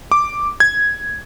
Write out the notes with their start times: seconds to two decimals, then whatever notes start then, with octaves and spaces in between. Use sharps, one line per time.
0.12 D6
0.60 G#6